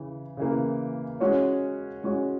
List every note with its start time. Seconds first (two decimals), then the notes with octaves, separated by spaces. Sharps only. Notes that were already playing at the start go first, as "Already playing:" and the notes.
Already playing: C#3 E3
0.37 C#3 E3 A#3
1.20 G#3 C#4 F#4 C#5
2.04 G#3 C#4 F#4 C#5